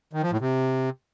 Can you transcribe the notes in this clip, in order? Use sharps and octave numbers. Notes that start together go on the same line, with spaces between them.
D#3
F3
A2
C3